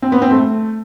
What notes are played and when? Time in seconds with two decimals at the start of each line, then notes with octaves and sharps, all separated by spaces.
0.02 C4
0.12 B3
0.22 C4
0.31 A3